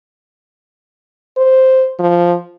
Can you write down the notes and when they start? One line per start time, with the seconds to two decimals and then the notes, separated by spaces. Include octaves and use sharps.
1.37 C5
1.99 F3